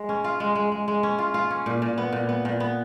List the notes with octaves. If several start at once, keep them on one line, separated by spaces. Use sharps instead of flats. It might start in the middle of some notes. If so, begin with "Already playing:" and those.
Already playing: G#3
C#4
F4
G#3
G#3
G#3
G#3
C#4
F4
F4
C#4
A#2
A#2
B3
A#2
B3
A#2
B3